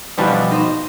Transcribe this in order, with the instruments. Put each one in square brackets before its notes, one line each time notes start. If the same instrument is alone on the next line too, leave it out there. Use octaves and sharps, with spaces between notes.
[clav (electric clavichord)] B2 F3 G3 [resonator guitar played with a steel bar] D3 E3
[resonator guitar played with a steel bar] D#4 C5